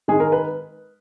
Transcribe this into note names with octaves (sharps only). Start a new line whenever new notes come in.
D#3 G#3 G#4
A#4
B4